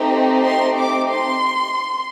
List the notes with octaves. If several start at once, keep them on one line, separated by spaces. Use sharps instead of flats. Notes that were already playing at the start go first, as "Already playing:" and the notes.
Already playing: A3 C4 D#4 G4
C6
D6
C6